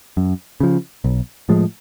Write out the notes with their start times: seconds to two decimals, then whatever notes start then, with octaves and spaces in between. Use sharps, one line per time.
0.17 F#2
0.60 C#3 F3
1.04 B1
1.49 A2 F3 G#3